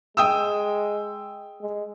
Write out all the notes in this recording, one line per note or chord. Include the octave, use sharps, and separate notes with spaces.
G#3 G5 D#6 E6
G#3